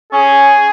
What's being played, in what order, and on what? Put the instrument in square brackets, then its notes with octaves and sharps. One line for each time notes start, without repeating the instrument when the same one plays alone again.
[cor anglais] C#4 [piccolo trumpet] G#4